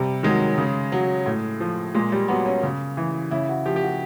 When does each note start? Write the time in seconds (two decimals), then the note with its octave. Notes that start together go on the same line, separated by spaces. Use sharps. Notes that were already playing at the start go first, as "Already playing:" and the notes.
Already playing: C3 G3
0.23 D#3 F#3 G#3
0.58 C#3
0.92 F#3
1.26 A2
1.60 F3
1.94 A#2 G#3
2.12 G3
2.28 F#3 B3
2.46 C#4
2.63 C#3
2.97 E3
3.31 C#3 E4
3.49 F#4
3.66 F3 G4
3.76 G4
3.83 F#4